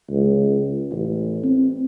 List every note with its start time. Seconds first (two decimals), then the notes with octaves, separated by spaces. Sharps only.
0.11 C#2
0.91 A1
1.43 C4